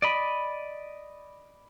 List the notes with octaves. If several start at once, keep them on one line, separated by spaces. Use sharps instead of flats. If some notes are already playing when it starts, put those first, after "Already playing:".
D5 D#5 B5